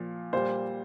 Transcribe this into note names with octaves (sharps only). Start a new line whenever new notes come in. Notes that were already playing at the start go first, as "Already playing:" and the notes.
Already playing: A#2 F3
A#2 G3 C5